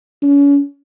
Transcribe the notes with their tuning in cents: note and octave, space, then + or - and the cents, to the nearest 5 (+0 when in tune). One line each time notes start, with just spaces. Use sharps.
C#4 +35